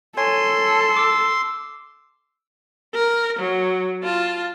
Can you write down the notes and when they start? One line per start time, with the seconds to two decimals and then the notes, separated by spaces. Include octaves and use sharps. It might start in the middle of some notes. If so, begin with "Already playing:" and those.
0.17 A4 C#5 G#5 C6
0.97 D6 E6
2.94 A#4
3.39 F#3
4.03 F4 A5